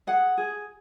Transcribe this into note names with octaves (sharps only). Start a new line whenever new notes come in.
G#4 F#5
G#4